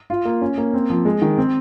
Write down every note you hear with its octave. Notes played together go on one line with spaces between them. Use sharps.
F4
A#3
C#4
A#3
C4
F3
G#3
D#3
C4